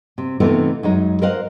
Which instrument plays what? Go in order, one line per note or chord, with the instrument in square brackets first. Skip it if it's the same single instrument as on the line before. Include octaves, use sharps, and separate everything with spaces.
[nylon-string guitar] C3
C3 E3 A3 B3 D#4 F4
F#2 G#3 D#4
A#4 C5 D#5 F5 F#5